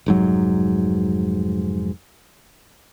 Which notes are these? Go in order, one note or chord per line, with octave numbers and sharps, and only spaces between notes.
F1 G#2 F#3